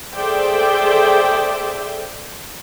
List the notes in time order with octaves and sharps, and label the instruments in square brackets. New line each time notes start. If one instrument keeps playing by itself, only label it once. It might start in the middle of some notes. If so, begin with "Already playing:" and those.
[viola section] G#4 A4 C5 D5 E5 G5